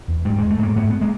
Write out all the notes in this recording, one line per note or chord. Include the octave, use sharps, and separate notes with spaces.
E2
G#2 G3
G#2 G#3
A3
G#2 A#3
G#2 A3 B3
B3
G#3 A#3